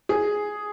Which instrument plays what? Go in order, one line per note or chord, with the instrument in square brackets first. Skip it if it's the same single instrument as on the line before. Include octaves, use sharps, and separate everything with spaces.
[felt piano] G#4